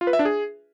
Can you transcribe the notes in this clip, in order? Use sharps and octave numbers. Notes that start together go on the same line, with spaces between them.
F4
B4
E5
D4
G#4